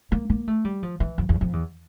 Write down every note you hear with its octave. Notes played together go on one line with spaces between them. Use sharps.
A#3
A#3
A3
G3
F3
E3
F2
E2
F2
E2